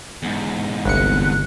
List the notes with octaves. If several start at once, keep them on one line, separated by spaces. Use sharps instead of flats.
E2 G#2
G1 C2 F#6 C#7